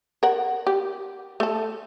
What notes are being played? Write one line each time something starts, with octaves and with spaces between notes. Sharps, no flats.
A#4 F#5
G4
A3 A4